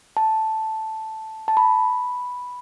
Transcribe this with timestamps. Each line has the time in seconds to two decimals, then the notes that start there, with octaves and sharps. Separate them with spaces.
0.17 A5
1.48 A5
1.57 B5